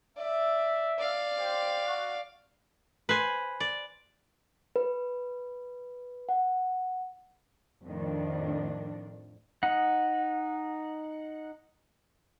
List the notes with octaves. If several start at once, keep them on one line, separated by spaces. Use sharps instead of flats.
D5 E5
D5 F5
G4 C5
F#4
B4 C5 G#5
D5
B4
F#5
F2 A2 D#3 D4
D#4 F#5